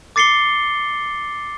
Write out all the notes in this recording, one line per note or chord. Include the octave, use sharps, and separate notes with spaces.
D6 A6 C7 C#7 G7